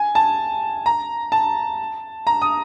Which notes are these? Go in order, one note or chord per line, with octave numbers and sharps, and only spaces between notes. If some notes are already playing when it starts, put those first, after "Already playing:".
Already playing: G#5
A5
A#5
A5
A#5
D#6